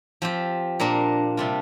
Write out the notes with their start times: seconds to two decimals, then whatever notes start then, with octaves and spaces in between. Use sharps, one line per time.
0.22 F3 C4 G4
0.80 A#2 A#3 D4
1.37 C3 G3 D4 F4